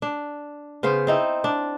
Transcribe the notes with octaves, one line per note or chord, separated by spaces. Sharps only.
D4
C#3 B3 C#4 C5
C4 D#4 E4
D4